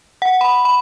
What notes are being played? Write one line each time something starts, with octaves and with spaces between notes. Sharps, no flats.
F#5
B5
B5